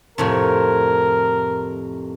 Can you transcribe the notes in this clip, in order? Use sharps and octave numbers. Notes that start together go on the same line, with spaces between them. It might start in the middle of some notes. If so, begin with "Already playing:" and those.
F2 A2 C3 A#4